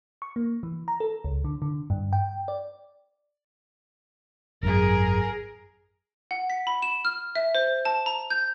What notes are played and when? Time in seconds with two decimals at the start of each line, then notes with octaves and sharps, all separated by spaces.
0.22 C#6
0.36 A#3
0.63 E3
0.88 A#5
1.00 A4
1.24 C#2
1.44 D3
1.62 D3
1.90 G2
2.13 G5
2.48 D5
4.63 G#1 F#2 G#4 A#4
6.31 F#5
6.50 B6
6.67 B5
6.82 E7
7.05 F6
7.35 E5
7.55 C5
7.85 A5
8.06 A#5
8.30 G6